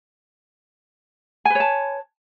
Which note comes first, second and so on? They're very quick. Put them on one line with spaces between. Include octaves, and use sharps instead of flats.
G#5 B4 C#5 A5